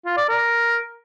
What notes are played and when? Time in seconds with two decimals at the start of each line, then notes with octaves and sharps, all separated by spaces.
0.05 F4
0.17 D5
0.29 A#4